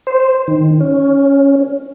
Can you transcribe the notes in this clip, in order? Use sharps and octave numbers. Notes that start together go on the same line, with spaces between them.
C5
D#3
C#4